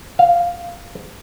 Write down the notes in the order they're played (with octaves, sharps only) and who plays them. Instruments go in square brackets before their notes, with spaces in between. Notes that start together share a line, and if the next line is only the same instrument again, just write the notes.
[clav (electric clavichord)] F5